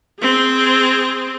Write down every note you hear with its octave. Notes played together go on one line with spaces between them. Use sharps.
C4 G#4